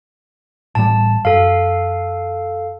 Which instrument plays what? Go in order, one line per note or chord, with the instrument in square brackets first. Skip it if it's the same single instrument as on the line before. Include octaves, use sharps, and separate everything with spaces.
[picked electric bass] A1 A2 G3 [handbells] A5
[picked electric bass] F#2 [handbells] A4 F5